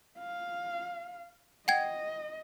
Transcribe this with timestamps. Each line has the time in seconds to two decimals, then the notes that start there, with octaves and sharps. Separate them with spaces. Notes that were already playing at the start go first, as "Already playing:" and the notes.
0.19 F5
1.68 D#5 F#5 G5 G#6